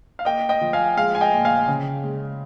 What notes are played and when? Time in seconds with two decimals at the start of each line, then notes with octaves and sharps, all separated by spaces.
0.19 F5
0.25 A#3 D#5 G5
0.49 D#5 G5
0.61 F3
0.73 F5 G#5
0.97 G#3 F5
1.15 G#5
1.21 D#5 G5
1.32 A#2
1.45 F5 G#5
1.68 C#3
2.04 G#3